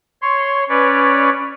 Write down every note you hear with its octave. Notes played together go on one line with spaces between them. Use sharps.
C#5 C6
C#4 B4 C#5 D5